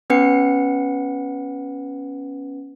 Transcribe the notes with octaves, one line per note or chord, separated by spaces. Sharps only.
B3 C#4 B4 F#5 C#7